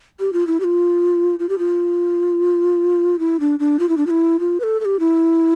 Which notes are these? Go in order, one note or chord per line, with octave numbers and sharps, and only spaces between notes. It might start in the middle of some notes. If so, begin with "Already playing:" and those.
G4
F4
E4
G4
F4
F4
G4
F4
E4
D4
D4
F4
E4
D4
F4
E4
F4
B4
A4
A4
G4
E4